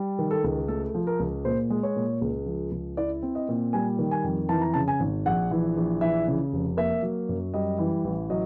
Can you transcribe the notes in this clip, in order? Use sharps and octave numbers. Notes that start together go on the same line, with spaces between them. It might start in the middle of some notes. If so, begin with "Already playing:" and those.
Already playing: G3
D#3
A4
C#2
A3 A4
F3
A#4
C#2
A#2 C5
G#3
C#5
A#2
C#2
F3
C#2
E4 D5
C4
D#5
A#2
G3 G#5
D#3
G#5
F2
E3 A5
A#5
C#3 A5
G#5
G#1
A#1 F#5
E3
A#1
E3 E5
C#3
F1
A#3 E5
F#3
F#2
G3 D#5
E3
A1
F#3 D#5